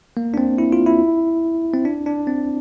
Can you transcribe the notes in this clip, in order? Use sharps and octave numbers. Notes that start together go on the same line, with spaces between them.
A#3
D4
C4
E4
F4
E4
C4
D4
D4
C4